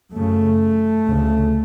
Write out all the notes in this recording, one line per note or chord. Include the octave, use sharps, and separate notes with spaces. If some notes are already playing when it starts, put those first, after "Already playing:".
F#2 C#3 A3
D2 C#3